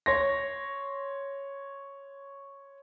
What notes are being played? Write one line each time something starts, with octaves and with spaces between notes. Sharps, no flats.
C#5 C6 A#6